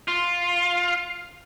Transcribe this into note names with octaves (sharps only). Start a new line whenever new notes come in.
F4